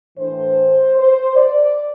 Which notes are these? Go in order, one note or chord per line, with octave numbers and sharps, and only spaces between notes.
A2 E3 A3 D4 C5
C5
D5